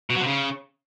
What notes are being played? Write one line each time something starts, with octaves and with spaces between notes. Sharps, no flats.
B2
F#3
C3
C#3